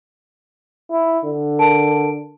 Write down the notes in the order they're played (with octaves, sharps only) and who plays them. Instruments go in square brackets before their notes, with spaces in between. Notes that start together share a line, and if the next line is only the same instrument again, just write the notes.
[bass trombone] E4
D3
[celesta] A#4 A5 D7